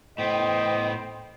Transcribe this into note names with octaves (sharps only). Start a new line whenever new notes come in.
A2 B3 C5 D#5 G5